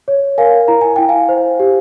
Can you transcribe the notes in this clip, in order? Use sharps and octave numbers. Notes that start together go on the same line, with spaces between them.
C#5
A#4 F5 G#5
E4 A#5
G#5
E4 G5
F5 G#5
C5
G4